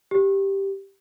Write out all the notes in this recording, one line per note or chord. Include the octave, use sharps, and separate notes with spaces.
G4